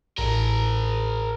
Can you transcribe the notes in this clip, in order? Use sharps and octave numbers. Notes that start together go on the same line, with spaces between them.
A1 G#4 A#4